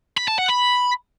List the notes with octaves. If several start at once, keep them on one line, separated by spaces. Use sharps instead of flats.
B5
A5
F#5
B5